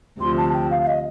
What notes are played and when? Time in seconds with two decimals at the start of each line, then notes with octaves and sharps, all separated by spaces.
0.19 D2 C3 F3 C6
0.37 A5
0.53 G5
0.70 F5
0.82 F5
0.87 D#5